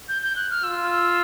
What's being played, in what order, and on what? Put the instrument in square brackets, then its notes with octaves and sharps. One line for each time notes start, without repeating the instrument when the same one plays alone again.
[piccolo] G6
G6
F#6
F6
[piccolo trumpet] F4 [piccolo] E6